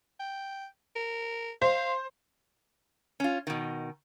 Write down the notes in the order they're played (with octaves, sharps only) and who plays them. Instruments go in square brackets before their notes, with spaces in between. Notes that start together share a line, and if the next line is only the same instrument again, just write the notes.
[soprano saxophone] G5
A#4
[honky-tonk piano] C5 [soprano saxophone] F5
[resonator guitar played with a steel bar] C#4 F4
B2 D#3